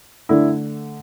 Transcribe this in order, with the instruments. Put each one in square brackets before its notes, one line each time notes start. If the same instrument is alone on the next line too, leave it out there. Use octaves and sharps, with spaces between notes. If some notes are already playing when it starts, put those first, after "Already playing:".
[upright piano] D3 A3 D4 E4